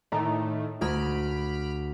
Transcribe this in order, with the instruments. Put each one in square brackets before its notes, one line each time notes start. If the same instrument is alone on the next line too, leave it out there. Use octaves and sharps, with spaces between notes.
[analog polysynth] A2 D#3 A3 [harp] D5 A#5
[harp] D2 A#4 G#6 [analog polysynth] B5 F6 D7